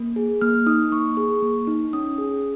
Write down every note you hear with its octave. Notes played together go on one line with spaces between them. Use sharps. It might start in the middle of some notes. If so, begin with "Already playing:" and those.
Already playing: A#3
G#4
A#3 F6
D#4 D#6
A#3 C#6
G#4
A#3
D#4
C#4 D#6
G#4